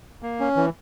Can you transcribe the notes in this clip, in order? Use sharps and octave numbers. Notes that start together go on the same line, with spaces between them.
A#3
C#4
E3